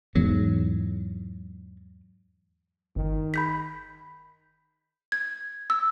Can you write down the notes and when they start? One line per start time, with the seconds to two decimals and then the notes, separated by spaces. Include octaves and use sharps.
0.15 E2 G#2 F#3
2.96 G1 D#3
3.34 B5 G6 B6
5.12 G#6
5.70 E6